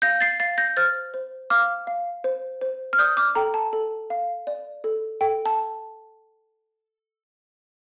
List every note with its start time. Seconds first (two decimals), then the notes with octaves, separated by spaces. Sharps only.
0.02 F5 G6 A#6
0.20 A6 C7
0.40 F5 A6 C7
0.58 G6 A#6
0.77 C5 F6 A6
1.14 C5
1.50 F5 D6 F6
1.87 F5
2.24 C5
2.61 C5
2.93 F6
2.99 D5 D#6 G6
3.17 D6 F6
3.35 A4 G5 A#5
3.54 A5
3.73 A4
4.10 F5
4.47 D5
4.84 A4
5.21 A4 G5
5.46 A5